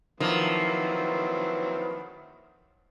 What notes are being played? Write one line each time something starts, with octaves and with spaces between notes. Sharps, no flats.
D#3 F3 F#3 A#3 C4 E4 B4